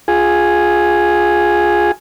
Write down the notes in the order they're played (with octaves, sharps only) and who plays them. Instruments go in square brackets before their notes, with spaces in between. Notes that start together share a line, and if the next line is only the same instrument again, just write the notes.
[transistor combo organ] F4 G#4 G#5